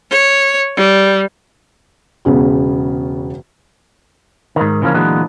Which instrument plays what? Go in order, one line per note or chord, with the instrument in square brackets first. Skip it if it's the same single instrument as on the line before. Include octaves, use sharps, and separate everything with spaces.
[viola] C#5
G3
[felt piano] E1 C#3 B3
[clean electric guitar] G#2 D#3
C#3 E3 F3 A#3 C#4
A#2 D3 E3 F#3 G#3 B3